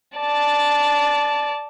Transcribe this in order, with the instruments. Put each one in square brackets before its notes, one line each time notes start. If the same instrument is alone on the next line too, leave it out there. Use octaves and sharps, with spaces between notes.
[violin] D5 A5